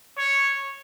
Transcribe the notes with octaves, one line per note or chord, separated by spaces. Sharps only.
C#5